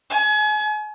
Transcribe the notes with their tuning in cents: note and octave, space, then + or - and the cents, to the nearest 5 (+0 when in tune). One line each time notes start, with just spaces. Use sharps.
G#5 +35